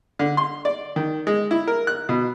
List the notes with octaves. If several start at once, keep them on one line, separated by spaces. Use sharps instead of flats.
D3
C6
D5
D#3
G#3
E4
A#4
F#6
B2